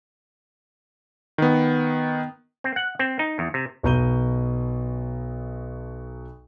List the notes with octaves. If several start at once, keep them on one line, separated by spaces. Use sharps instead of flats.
D#3 B3
C4
F#5
C4
D#4
E2
C3
B1 B2 A#5 G6 D#7 G7